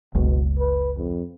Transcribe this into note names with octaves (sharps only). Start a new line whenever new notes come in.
F#1 C#2 B2
B4
F2